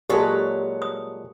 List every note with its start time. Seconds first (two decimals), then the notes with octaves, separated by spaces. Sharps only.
0.10 A#2 F#3 G#3 G4 A4 B4 C#5 A5
0.82 D#6